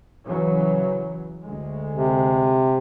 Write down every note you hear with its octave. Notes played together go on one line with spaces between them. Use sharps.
C#3 E3 F#3
D2 G#3
C3